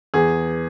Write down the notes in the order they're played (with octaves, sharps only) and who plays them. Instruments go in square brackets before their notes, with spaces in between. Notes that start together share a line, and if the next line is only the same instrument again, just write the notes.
[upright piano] E2 [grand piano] G#4